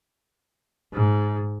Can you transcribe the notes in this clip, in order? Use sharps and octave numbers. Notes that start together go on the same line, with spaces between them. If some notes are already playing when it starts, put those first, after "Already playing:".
G#2